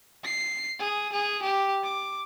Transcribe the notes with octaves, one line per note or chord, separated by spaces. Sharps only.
C7
G#4
G#4
G4
D6